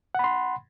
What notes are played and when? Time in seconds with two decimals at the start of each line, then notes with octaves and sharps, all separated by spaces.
0.15 F#5
0.19 B5
0.24 C6